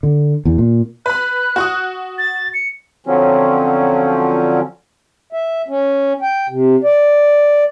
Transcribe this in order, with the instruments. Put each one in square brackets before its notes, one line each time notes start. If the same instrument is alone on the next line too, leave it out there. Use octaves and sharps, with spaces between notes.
[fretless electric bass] D3
E2
A#2
[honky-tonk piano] B4 B5 [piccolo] F#6
[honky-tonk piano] F#4 C#6 D#6
[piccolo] A6
C#7
[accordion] D3 F3 F#3 C4 C#4
[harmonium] E5
C#4
G5
C3
D5